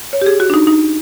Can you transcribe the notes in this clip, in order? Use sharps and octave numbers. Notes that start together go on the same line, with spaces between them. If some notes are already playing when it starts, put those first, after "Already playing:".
C#5
G4
G#4
F#4
D4
D#4
D#4